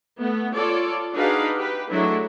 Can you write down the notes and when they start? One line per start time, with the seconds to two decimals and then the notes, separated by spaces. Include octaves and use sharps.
0.19 A3 B3
0.54 F4 A4 C#5 D5
1.13 D4 D#4 F#4 G#4 B4 F5
1.57 G4 B4
1.90 F#3 G#3 A3 D4 E4